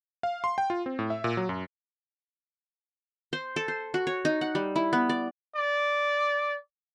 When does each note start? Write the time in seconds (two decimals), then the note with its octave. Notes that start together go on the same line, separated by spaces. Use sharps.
0.23 F5
0.44 C6
0.58 G5
0.70 F4
0.86 C4
0.99 A2
1.10 E5
1.24 A#2
1.37 F#3
1.49 F#2
3.33 C5
3.56 A4
3.68 C5
3.94 F#4
4.07 C#5
4.25 D#4
4.41 F#5
4.55 G3
4.76 E4
4.93 B3
5.09 D5
5.56 D5